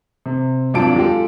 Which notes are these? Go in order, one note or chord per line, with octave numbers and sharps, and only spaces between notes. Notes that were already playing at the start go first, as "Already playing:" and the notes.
C3
G#1 F#3 D4 F4 A5 D7
G#3 F4 G4 A4